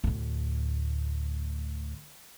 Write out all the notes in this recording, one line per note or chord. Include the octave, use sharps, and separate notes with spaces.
D2 A2